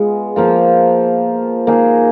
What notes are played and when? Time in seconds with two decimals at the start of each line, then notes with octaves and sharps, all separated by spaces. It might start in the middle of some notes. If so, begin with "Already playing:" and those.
Already playing: G#3 B3 F4
0.36 F3 A#3 F4
1.67 A#3 D#4 G#4